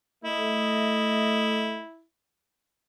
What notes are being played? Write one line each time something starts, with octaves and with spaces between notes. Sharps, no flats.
A3 E4 D#5